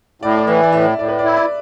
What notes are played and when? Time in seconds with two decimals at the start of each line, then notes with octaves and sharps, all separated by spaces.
0.22 A2 D5
0.37 D5
0.47 E3 E5
0.64 D5
0.72 A2 E5
0.98 A2 D5
1.08 B4
1.19 D5
1.24 E4
1.37 D5